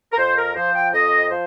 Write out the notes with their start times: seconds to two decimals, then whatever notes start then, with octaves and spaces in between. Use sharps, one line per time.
0.13 A#4
0.18 F2 C5
0.37 A#4
0.56 F3 C5
0.75 G5
0.93 F2 D#5
1.30 F3 C5